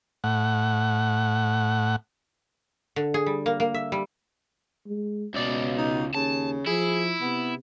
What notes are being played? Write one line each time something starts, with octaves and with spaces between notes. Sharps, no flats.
A2 F#5
D3
G#4
G3
A#3
A#3
E5
G3
G#3
C#2 B2 D5
D#4
D#2 C#3 A5
F3 E4 G#4
C3 B3